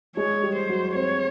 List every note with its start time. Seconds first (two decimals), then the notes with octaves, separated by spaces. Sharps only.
0.16 G#3 G#4 C#5
0.43 G3 G4
0.56 C5
0.69 F#3 F#4
0.95 C4 C5 C#5